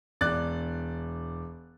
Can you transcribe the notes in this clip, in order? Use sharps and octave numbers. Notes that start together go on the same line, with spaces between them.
E1 D5 F#6 A6